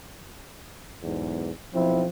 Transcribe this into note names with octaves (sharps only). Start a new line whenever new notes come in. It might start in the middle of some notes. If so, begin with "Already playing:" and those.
B1 E2 G#2
B1 F3 C4 E4